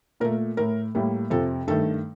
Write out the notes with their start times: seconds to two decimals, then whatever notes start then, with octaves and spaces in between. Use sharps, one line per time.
0.20 A#2 A3 A#4
0.57 A2 A3 A#4
0.95 A2 G3 A#3
1.30 F2 C3 F3 A4
1.67 G2 D#3 A3 A4